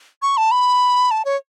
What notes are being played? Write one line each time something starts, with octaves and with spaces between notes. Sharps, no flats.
C#6
A5
B5
A5
C#5